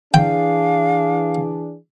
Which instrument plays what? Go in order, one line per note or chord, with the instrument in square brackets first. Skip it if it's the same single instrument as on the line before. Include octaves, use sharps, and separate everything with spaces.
[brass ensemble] E3 D4 G#4 [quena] F5 [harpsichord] G5